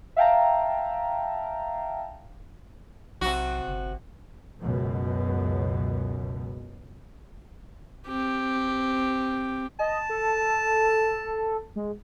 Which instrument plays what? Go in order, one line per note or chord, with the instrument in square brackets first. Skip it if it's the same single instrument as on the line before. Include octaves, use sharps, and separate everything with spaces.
[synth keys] E5 F5 G5 A5 A#5
[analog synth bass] B1 [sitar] C3 F#4
[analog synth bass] G1
[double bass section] C#2 F#2 B2
[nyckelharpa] C4 G4
[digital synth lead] D#5 [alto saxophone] A5
[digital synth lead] A4
G#3